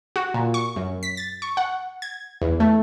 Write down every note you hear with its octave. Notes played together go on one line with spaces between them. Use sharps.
F#4
A#2
C#6
F#2
B6
A6
C#6
F#5
G#6
E2
A3